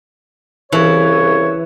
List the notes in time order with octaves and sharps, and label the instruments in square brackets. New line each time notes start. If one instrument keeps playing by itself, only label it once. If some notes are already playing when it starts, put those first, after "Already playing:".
[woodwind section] C2 C#3 C#5 [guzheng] E3